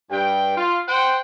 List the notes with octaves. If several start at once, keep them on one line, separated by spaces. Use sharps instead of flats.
G2 G5
F4
C5 F#5 G5